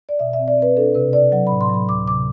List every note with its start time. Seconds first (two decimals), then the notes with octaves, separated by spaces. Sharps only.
0.09 D5
0.19 B2 E5
0.33 E5
0.39 C4
0.48 D5
0.58 C4 B4
0.77 D4 A4
0.94 C3 B4
1.13 C3 D5
1.32 F#3 F#5
1.47 A2 B5
1.61 C6
1.70 F#3 B5
1.88 D2 D6
2.08 C3 D6